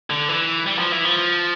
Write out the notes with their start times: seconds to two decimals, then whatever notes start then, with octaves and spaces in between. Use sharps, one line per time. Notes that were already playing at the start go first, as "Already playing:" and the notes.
0.10 D3
0.29 E3
0.66 G3
0.79 F3
0.92 E3
1.05 F3